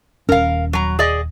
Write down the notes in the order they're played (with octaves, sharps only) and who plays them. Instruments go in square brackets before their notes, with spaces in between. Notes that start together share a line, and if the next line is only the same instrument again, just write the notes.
[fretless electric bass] D#1 C#4 [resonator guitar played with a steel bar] A#4 F5
[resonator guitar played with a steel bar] F#3 A#5
G#4 D5 D#5